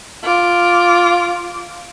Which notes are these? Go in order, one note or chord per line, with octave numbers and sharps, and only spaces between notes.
F4 D6